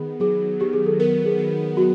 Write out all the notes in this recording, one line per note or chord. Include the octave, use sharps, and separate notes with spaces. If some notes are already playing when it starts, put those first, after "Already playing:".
Already playing: D#3 B3 G#4
F#3 G#4
D#3 G4
G#4
A4
B3 A#4
G#4
D#3
F#3 F#4